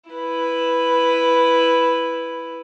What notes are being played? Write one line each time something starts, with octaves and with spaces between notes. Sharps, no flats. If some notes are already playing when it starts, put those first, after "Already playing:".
E4 B4